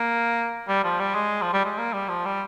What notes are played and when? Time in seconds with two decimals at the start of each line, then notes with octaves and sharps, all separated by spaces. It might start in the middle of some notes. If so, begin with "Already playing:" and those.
Already playing: A#3
0.68 G3
0.84 F3
1.00 G3
1.15 G#3
1.42 F3
1.54 G3
1.65 G#3
1.78 A#3
1.93 G3
2.09 F3
2.25 G3